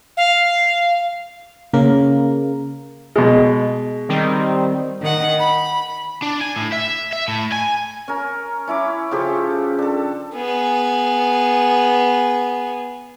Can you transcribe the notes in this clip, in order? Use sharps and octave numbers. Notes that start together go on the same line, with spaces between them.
F5
C#3 A#3 A#4
B2 G#3
D#3 G3 C4
D#3 F#5
B5
D4
G#5
A2
E5
E5
A2
G#5
C#4 A#4
C#4 E4 B5 D6
C#3 F3 G4 A4
D4 A4
B3 G#4